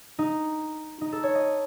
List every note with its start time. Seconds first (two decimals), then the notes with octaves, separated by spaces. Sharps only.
0.19 D#4
1.01 D#4
1.12 A4
1.23 C#5
1.35 D#5